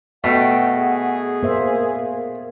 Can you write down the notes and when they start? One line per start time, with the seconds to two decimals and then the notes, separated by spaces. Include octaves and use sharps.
0.24 B2 A3 E5 F#5 G5
0.77 G#4
1.43 A#3 A#4 C5 E5